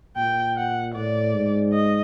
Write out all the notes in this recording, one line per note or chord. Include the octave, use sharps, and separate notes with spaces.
A#2 G5
F#5
A2 D5
G#2
D#5